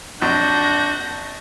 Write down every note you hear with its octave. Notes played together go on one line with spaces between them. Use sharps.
A#1 F2 F#3 D4 F#4 G6 A#6